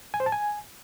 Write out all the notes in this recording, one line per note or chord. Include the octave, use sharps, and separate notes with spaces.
G#5
C5
A5
G#5